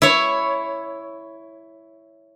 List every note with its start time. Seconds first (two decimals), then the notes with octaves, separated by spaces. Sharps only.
0.02 E4 C#5